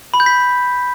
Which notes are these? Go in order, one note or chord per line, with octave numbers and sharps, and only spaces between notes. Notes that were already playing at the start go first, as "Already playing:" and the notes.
B5
G6
B6